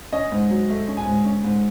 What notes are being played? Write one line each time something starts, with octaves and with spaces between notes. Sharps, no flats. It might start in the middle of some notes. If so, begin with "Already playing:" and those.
C#4 D#5
G#2
F#3
A3
C#4
G#5
G#2
C#4
G#2